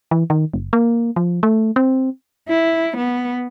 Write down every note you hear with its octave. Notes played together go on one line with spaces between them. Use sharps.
E3
D#3
F#1
A#3
F3
A3
C4
E4
B3